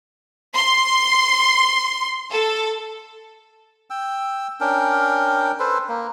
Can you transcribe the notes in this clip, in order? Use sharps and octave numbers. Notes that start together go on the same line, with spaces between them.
C6
A4
G5 E6
C#4 D4 A#4 G5
A4 B4 C5
A#3